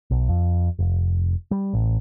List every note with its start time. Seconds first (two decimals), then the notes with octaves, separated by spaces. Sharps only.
0.11 B1
0.29 F2
0.79 F1
1.51 G3
1.73 A1